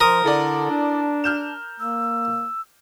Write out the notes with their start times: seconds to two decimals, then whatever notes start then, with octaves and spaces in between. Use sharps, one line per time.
0.01 F3 A#4 C6 D#6
0.24 D3 E4 A4 D5 A5
0.70 D4
1.24 F6 G6 E7
1.80 A#3 E6